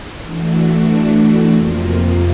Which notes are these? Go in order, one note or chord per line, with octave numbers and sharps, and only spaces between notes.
E3 A3 D4 F#4
F2 C3 F3 A#3